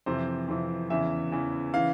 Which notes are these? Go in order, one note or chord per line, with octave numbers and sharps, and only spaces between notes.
F2 C3 E3 C5
F2 C3 E3
E2 C#3 E3 E5
E2 C#3 E3
C#3 E3 F5